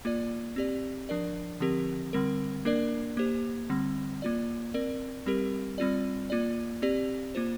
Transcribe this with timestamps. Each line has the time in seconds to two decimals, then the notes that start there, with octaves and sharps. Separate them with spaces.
0.05 A#3 F4 D5
0.56 C4 G4 D5
1.09 F3 D4 A#4 D5
1.60 D3 F3 C4 G4 A#4
2.13 D3 G3 C4 A#4
2.65 A#3 D4 A#4 D5
3.17 A#3 G4 C5
3.69 D3 G3 C4
4.22 A#3 F4 D5
4.74 C4 A#4 D5
5.26 G3 C4 G4 A#4
5.78 G3 C4 F4 D5
6.30 A#3 F4 D5
6.82 C4 G4 D5
7.35 A#3 F4 C5